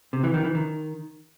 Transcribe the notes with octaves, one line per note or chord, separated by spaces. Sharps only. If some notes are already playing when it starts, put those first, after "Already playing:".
C3
E3
D#3
E3
D#3